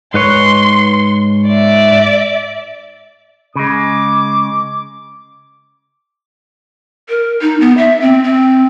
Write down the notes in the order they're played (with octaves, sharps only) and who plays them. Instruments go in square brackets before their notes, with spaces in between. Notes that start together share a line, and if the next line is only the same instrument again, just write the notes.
[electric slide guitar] G#2 B4 C#5 [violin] C6
[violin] D5 E5
[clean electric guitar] C#3 G#3 [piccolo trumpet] D6
[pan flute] A#4
D#4
B3
E5
C4
C4